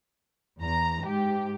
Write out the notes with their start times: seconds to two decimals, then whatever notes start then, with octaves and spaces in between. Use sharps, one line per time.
0.59 E2 A#5
1.06 G#2 G4